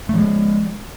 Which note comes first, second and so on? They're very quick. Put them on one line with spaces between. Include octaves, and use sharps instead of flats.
A3 F3 G#3